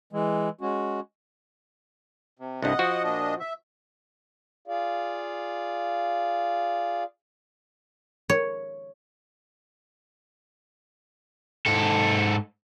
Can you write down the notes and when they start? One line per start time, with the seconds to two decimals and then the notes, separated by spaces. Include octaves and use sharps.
0.13 E3 G#3
0.61 G#3 C#4 F#4
2.39 C3
2.62 C2 G2 D#5 F#5
2.79 F3 F#4
3.04 A#2 D4 D#5
3.40 E5
4.68 F4 G#4 D5 F5
8.30 C#5
11.66 G#2 A4